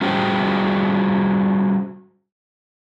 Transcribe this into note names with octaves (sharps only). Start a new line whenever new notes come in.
G3 C#4 F#4 G#4 C5 G5